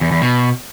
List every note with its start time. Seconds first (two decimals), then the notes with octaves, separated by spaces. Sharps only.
0.01 E2
0.12 E2
0.22 B2